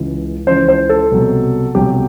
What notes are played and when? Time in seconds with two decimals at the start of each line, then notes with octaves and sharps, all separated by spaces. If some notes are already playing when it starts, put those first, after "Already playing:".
Already playing: C#2 C#3 E3
0.47 C#2 C#3 E3 C5
0.69 C5
0.89 A4
1.11 C2 B2 F#3
1.75 C2 B2 F#3 G4